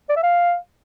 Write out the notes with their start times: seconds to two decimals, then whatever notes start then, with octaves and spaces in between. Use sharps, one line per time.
0.09 D5
0.16 E5
0.23 F5